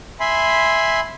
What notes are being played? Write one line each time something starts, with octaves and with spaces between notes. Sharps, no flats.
E5 G#5 B5 C6